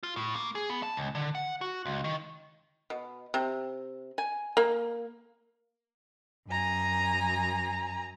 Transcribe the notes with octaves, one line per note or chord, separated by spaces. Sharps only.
F4
A2
A#3
G#4
B3
A5
C#2
D3
F#5
F#4
C#2
D#3
B2
C3
G#5
A#3
F#2 G#5 A#5